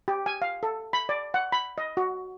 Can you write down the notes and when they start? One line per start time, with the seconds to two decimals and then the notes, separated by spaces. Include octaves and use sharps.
0.08 G4
0.26 G#5
0.42 F5
0.63 A4
0.93 B5
1.09 D5
1.34 F#5
1.52 B5
1.78 D#5
1.97 F#4